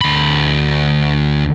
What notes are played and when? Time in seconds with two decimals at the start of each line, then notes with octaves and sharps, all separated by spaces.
0.01 D2 B5